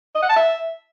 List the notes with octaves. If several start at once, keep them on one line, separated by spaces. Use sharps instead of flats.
D#5
F#5
A5
E5